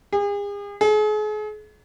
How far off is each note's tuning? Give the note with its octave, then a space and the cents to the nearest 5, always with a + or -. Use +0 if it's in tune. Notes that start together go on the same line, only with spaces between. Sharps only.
G#4 -40
G#4 +40